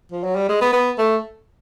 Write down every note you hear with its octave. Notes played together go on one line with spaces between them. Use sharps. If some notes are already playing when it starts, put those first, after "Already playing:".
F3
F#3
G3
G#3
B3
B3
A3